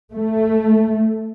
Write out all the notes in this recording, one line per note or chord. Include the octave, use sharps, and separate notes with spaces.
A3